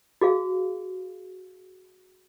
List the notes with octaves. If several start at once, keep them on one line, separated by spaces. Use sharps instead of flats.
F#4 G#4 F5